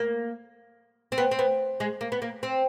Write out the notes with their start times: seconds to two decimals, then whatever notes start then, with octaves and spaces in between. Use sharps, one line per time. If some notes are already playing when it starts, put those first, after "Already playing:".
Already playing: A#3
1.12 C4
1.18 B3
1.31 C4
1.39 B3
1.80 G#3
2.01 A#3
2.12 B3
2.22 A#3
2.43 C4